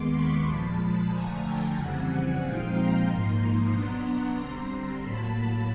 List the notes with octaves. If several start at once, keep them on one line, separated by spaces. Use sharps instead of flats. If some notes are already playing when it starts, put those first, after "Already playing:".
Already playing: D#2 D#3 G#3 B3 C6 D6
B5 C#6
A#2 F3 G#3 A5 B5
D3 F3 A3 G#5 A#5
G5 A5
F2 C#3 E3 G3 C4 F#5 G#5
A#2 F3 G#3 C4 D#4 F5 G5
A#5 C6
G#2 F3 A#3 D#4
B2 F#3 B3 D4 A#5 C6
D3 G3 C4 A#5 C6
A2 F#3 A#3 A5 B5
A5 B5